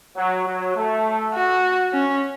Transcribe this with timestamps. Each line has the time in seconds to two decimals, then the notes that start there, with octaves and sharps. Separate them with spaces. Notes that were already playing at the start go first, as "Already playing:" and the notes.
0.17 F#3
0.46 F#3
0.76 A3
1.35 F#4
1.93 C#4